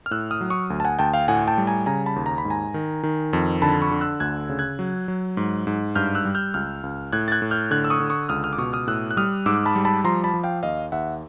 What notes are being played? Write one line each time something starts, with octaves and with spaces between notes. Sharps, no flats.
F6
A2 E6 F#6
D#6 F6
F#3
C#6 D#6
D2
A5
F#5 G#5
D2 G5 A5
F5 G5
A2 F#5 G#5
G5 A5
G3
G#5 A#5
C#3 G#5 A#5
A5 B5
D#2
A#5
B5
G#2
G#5 A#5
D#3
D#3
F2
D3 A5 B5
B5 C#6
D3
E6 F#6
D2 F#6 G#6
C#3
F#6 G#6
F#3
F#3
G#2
G#2
G2 F6 G6
E6 F#6
G3
F6 G6
C#2 F6 G6
C#2
A2 F#6 G#6
A6
F#6 G#6
A2
F6 G6
D3 F#6 G#6
E6
C#6 D#6
D3
C#6 D#6
C#2 D#6 F6
D#6 F6
D6
B2 C#6 D#6
D#6 F6
A2 E6 F#6
F#6
G3 D#6 F6
G#2 D6 E6
A5 B5
G3
A5 B5
F3 A#5 C6
A5 B5
F3
F5 G5
D#2 D#5 F5
D#2 E5 F#5